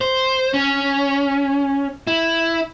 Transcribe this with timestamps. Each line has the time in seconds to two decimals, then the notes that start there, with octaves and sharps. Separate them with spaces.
0.01 C5
0.54 C#4
2.07 E4